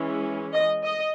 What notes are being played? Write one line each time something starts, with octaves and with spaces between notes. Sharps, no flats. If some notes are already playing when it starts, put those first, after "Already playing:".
Already playing: E3 G#3 C#4
D#5
D#5